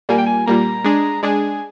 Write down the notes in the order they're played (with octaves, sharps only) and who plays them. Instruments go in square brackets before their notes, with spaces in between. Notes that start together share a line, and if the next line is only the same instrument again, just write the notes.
[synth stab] A#2 G3 A#3 [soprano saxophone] G#5
[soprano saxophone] G5
G#5
[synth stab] A#2 G3 A#3 [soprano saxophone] A#5
[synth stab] G#3 D4 G#4
[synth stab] G#3 D4 G#4 [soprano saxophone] G#5